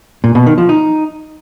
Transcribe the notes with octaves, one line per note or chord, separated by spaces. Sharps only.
A#2
B2
D#3
F3
D#4